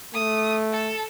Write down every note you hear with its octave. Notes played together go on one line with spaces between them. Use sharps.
A3 D#6
A4